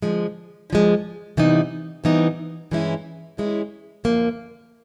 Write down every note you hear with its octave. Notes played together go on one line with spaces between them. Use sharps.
D3 F3 G#3
D3 F3 G#3
C3 E3 G3 B3 D#4
C3 E3 G3 B3 D#4
G2 E3 G#3 C#4 E4
G2 E3 G#3 C#4 E4
F#2 D3 F3 A#3